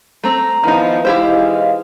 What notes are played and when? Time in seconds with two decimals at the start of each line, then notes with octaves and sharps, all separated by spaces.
0.24 A3 C4 A#5
0.64 D#3 F3 B3 D#4 E4
1.05 E3 G#3 D#4 E4 G4 C5 F5